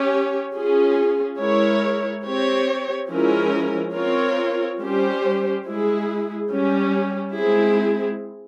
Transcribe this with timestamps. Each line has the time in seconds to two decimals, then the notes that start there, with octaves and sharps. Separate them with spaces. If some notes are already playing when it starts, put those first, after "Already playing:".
Already playing: C#4 G4 C#5
0.53 C#4 F4 G#4
1.39 G#3 E4 A#4 C#5
2.24 C4 G4 C#5
3.09 F3 G#3 C#4 E4 A#4
3.94 C4 F4 A#4 C#5
4.79 G3 C#4 G4 C5
5.65 G#3 E4 G#4
6.50 G3 C#4 G4
7.36 G#3 C4 E4 G#4